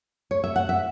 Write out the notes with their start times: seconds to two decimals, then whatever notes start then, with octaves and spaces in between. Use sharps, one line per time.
0.31 C#5
0.44 E5
0.56 F#5
0.69 E5